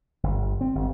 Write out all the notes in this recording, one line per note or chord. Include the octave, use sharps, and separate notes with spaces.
G1
C4
G1